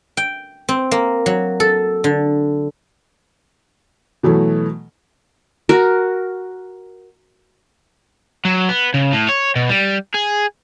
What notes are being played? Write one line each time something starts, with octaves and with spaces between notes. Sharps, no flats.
G5
C4
A#3
F#3
A4
D3
B2 E3 F#3 A3
F#4 A#4
F#3
B3
C#3
A2
C#5
B2
G3
G#4